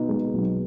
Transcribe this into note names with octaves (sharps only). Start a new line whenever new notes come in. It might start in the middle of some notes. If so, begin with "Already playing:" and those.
Already playing: B2 D#4
G#3
B1